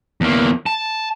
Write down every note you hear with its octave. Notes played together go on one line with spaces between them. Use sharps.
E2 A#3
A5